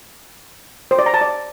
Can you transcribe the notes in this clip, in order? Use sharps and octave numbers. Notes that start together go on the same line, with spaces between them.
C5
D5
A#5
A5
D5